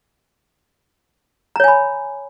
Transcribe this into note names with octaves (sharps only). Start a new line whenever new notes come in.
C#5 G#5 A#5 B5